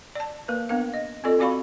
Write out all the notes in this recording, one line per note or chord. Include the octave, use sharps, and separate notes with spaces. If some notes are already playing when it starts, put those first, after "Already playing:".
D5 A5
A#3 A#4 B4
B3 D4 A#4 F5
D#5
C4 F4 A4 D5 D#5
C4 F#4 D5 F5 B5 C#6